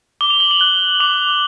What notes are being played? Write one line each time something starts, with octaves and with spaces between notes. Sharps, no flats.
D6 G7
F7
F#7
F#7
F#6 G7
D6 F7